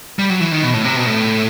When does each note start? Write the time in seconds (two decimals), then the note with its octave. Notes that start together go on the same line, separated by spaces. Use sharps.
0.19 G3
0.30 F#3
0.40 E3
0.52 D#3
0.63 B2
0.74 A2
0.85 C3
0.96 B2
1.06 A2